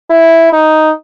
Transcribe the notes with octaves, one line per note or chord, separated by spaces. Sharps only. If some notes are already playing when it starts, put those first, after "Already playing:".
E4
D#4